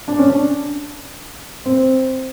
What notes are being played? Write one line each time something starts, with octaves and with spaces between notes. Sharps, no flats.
D4
C#4
D4
C4